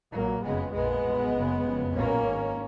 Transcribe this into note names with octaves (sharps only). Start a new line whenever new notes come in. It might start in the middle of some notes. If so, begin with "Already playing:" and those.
B1 A#2 F#3 A#3
F#1 F2 C#3 G#3 B3
A#1 A#2 G#3 B3
B1 A#2
F#1 F#2 C#3
F#1 F2 C#3
B1 A#2 A#3 C#4
G#1 G#2